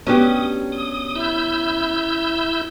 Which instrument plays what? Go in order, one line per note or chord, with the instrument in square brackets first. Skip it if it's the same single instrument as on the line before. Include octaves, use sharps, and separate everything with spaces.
[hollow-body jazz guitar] B3 D4 [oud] C#4 F#4 G4 [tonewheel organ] D#6
[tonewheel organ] D#6
E4 E6 G6